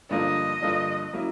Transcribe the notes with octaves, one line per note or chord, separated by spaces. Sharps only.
G2 D3 F3 A#3 D4 D#5
G2 D3 F3 A#3 D4
F#3 A#3 C#4 E4